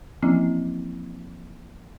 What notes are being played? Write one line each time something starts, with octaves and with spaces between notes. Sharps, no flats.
E3 F3 A#3 C4 C#4 E4